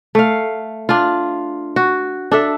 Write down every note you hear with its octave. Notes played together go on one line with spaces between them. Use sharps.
A3 F5
D4 F4
F#4
D4 A4 E5